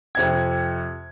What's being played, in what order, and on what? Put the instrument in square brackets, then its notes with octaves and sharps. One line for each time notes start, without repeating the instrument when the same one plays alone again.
[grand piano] F2 C3 G#6